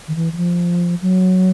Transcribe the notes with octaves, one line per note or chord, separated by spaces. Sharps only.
D#3
E3
E3
F3
F#3